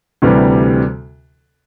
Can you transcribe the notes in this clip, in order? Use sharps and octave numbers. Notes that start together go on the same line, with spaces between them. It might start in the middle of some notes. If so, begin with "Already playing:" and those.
D2 C3 E3 G3